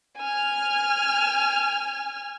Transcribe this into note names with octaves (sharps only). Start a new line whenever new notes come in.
G#5 F6